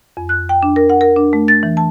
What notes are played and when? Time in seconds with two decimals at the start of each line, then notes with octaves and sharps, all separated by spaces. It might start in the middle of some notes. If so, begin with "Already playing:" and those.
0.17 F2
0.29 F#6
0.49 G5
0.63 D4
0.76 A#4
0.90 F#5
1.01 A#4
1.16 D4
1.33 A3
1.48 A6
1.63 E3
1.77 A5